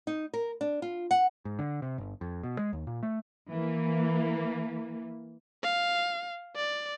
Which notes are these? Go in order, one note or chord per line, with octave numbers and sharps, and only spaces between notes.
D#4
A#4
D4
F4
F#5
G#2
D3
C3
G1
F2
B2
G#3
D#2
A#2
A3
E3 A#3
F5
D5